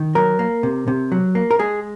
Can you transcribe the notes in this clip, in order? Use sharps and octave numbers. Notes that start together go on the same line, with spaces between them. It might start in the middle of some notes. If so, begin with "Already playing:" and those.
Already playing: D#3
F#3 A#4
A#3
C3
C3
F#3
A#3
A#4
G#3 G#4